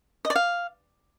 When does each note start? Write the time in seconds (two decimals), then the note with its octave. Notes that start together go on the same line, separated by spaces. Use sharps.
0.25 D#5
0.30 D5
0.35 F5